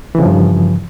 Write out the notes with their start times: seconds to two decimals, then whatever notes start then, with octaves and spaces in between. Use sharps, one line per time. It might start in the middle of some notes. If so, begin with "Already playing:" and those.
0.15 E3
0.18 C#3
0.22 F3
0.26 G2